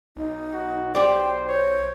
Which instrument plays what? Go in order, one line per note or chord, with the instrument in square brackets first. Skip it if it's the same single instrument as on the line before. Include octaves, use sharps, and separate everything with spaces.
[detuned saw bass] B1 [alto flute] D#4
[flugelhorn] F#4
[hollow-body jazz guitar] G4 D5 [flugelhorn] C5 [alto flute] G5
[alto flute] C5 [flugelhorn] C#5